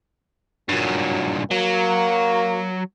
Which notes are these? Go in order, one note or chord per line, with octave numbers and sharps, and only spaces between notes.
G2 A#2 F#3
F#3 A#3